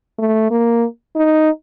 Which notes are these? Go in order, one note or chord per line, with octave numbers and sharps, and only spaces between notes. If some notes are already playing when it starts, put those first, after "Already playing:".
A3
A#3
D#4